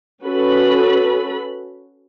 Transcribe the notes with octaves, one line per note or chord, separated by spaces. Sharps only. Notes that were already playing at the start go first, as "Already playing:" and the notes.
C#4 F#4 A4 B4 B5